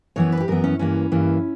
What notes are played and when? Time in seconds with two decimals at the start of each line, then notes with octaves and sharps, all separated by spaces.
0.16 F#2 E3 B3 C#5
0.32 B4
0.40 G4
0.48 F#2 E3 B3 A#4
0.64 C#4
0.79 G2 E3 A#3 C#4
1.12 G2 E3 A#3